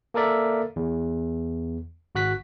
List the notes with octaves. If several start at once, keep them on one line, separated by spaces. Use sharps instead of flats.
A#3 A4 A#4 D5 E5
E2
G#1 F#4 F#6 B6